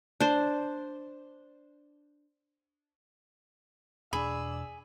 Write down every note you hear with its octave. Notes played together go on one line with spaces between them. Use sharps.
D4 C5
E1 D4 G#4 D5 B5 E6